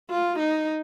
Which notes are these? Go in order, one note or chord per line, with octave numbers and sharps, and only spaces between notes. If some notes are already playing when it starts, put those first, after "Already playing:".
F4
D#4